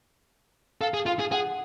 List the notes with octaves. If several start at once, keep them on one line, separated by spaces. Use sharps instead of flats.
A4 F5
G#4
F4 F5
G#4
G#4 F#5